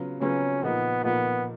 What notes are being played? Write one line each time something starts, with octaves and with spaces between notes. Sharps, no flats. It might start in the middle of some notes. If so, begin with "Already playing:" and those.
Already playing: C#3 F#3 B3 F4
C#3 F#3 B3 C#4 F4
A#2 F3 A#3 B3 D#4
A#2 F3 A#3 B3 D#4